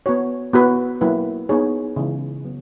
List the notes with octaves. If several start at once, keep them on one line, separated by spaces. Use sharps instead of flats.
B3 F#4 C#5
B3 F#4 B4
F#3 A#3 E4 B4
B3 D#4 G#4 C#5
C#3 E3 G#3
F#3 B3